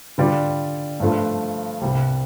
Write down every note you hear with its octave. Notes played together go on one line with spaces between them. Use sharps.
D3 G3 F4 D5
G2 F3 A3 F4
C2 C3 G3